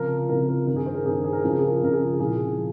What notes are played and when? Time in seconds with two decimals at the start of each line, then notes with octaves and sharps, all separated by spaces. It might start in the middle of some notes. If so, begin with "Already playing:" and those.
Already playing: C#2 C3 F3 A#4
0.29 C#2 C3 F3 A#4
0.49 A#4
0.67 G2 D#3 A#4
0.76 G#4
0.86 C5
0.95 A#4
1.05 G2 D#3 G#4
1.24 G#4
1.33 A#4
1.41 C#2 C#3 F3 G#4
1.50 A#4
1.59 G#4
1.67 A#4
1.76 G#4
1.81 C#2 C#3 F3 A#4
1.93 G#4
2.19 C2 A#2 F3 G#4
2.57 F3